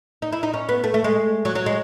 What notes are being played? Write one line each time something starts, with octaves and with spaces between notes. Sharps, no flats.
D#4
E4
D#4
C#4
B3
A3
A3
G#3
F#3
F#3
G#3